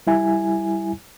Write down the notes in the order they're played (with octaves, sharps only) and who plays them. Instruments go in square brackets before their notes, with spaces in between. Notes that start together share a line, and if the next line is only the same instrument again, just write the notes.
[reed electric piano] G3 E4 G#5